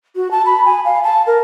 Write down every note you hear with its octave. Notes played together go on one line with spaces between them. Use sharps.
F#4
A5
B5
G#5
F5
A5
A#4